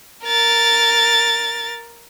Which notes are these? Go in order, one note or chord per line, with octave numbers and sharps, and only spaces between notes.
A#4 A6